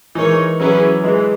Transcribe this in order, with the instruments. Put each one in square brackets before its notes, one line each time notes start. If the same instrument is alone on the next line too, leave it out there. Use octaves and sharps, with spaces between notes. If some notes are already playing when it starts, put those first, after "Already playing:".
[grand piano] E3 [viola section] G#3 D#4 A#4 C#5
[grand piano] F#3 [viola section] C#4 E4 G#4 B4
[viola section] E3 [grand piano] G#3